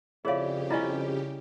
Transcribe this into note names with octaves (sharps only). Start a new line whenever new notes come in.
F2 C#3 E4 G4 G#4 C#5 D5 F5
G3 C#4 E4 F4 D#5